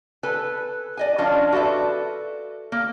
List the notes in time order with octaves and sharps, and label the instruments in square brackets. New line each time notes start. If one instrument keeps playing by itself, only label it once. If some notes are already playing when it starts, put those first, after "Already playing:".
[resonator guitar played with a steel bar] A4 B4 G#5
D5 D#5 G#5
F3 C#4 D4 F4
F#4 A4 B4 D5 E5
A#3